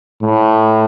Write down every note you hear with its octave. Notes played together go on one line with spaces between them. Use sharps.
A2